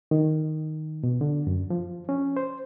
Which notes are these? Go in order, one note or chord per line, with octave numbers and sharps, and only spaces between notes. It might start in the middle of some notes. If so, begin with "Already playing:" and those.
D#3
B2
D3
F#2
F3
C#4
C5